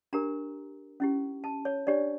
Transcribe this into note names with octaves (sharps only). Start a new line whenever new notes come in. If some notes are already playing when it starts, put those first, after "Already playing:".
D4 G4 A#4 A#5
C#4 E4 G4
A5
C#5
D4 G4 C#5 D5